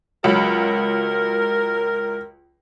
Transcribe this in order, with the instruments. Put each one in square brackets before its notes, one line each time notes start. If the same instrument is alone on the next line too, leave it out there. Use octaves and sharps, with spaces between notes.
[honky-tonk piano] C#2 F#3 B5 [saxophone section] A#4